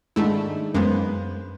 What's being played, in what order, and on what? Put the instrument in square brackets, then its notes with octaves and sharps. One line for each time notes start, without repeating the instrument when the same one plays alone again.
[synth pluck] G#2 A3 E4 [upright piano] D#3 G#3 D4
[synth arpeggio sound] F#2 [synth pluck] G#3 A#3 B3 [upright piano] B4 C5